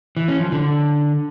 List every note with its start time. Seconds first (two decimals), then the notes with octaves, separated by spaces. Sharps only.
0.17 E3
0.28 C#4
0.40 F3
0.52 D3